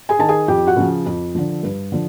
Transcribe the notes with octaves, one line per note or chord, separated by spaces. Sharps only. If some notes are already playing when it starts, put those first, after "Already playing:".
G#4 G#5
D#3 A5
G#4 G#5
F2 G4 G5
F#4 F#5
C#3 F3
F2
D3 F3
G2
D3 F3